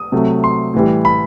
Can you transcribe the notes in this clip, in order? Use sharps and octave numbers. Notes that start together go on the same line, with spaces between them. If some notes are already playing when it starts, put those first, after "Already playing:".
Already playing: D#6
C3 F#3 A3
C6
A2 E3 G3
B5